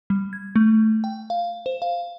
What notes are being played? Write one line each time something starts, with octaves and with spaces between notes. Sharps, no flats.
G3
G#6
A3
G5
F5
C5
F5